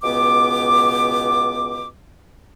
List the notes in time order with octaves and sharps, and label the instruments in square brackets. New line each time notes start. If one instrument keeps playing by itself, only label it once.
[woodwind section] C#2 B2 B3 D6